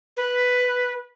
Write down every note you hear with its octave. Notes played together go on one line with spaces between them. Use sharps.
B4